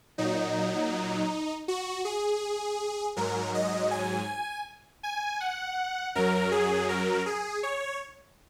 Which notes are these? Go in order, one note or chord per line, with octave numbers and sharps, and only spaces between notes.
A#2 F#3 D#4
F#4
G#4
G#2 F#3 A#4
D#5
G#5
G#5
F#5
F#2 F#3 A#4
G#4
A#4
G#4
C#5